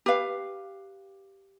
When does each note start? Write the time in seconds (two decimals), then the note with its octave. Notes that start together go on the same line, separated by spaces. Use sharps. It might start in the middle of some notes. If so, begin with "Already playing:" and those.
0.06 G4 B4 F5